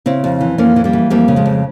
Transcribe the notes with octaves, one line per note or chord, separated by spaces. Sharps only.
C#3 C4 E4
F2
E3
F2 A#3 C#4
E3
G3 A#3
E3
F2 G3 A#3
C#3
F3 G#3
F2